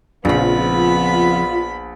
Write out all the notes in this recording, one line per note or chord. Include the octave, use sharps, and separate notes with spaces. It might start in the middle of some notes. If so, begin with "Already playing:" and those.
A#1 F2 C#3 B3 F4 B5